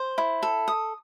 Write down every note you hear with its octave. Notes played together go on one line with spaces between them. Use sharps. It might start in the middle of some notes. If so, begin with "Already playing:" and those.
Already playing: C5
E4
A4
D#6